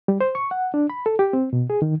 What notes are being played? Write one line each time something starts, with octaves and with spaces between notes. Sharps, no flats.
G3
C5
C#6
F#5
D4
B5
A4
G4
C4
B2
G#4
D#3